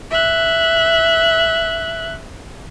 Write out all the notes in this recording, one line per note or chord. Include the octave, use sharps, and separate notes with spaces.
E5 F#6